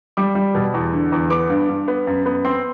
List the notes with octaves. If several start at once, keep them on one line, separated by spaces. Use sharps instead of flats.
G3 D6
G3
B2
E2
D3
E2
B3 D6
G2
G2
B3
F#2
B3
C4 C6